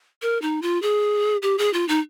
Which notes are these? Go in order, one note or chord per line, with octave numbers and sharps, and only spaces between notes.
A#4
D#4
F4
G#4
G4
G#4
F4
D#4